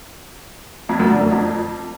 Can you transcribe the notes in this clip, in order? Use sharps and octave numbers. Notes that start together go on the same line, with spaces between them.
F2
F#2
D3
F#2
F2